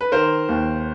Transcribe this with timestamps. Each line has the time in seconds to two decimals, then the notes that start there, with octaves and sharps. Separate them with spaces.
0.01 B4
0.12 D#3 A#4 C5
0.49 D#2